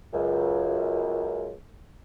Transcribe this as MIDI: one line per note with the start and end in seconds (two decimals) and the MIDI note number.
0.13 1.54 37
0.13 1.54 42